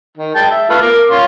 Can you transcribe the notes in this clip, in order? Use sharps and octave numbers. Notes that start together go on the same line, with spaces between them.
D#3
G#3 G5 A5
E5
A3 F4 B4
A#4 D6
C#4 F5 C6